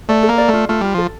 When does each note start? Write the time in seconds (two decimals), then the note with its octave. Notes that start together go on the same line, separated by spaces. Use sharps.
0.09 A3 D5
0.23 A4
0.29 A#3
0.38 D5
0.48 A3
0.53 F4
0.69 A3 F4
0.81 G3 F4
0.94 F3 A4